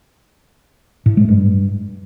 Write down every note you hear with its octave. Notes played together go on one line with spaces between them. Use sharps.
A2
G#3
G2